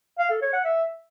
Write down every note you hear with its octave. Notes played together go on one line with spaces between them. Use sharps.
F5
A4
C#5
F#5
E5